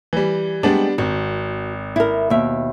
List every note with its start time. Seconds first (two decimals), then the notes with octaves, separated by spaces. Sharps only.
0.13 E3 G3
0.63 G3 G#3 B3 C4 D4
0.98 G#1 F#4
1.96 E4 A#4
2.30 D#2 B2 E5